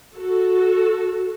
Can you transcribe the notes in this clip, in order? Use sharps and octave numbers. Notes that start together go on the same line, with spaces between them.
F#4 A4